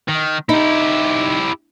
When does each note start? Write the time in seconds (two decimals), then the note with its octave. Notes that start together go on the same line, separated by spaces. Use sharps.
0.08 D#3
0.49 D#4 E4 G4